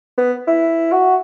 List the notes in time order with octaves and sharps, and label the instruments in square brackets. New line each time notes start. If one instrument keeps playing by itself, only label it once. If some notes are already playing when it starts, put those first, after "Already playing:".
[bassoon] B3
E4
F#4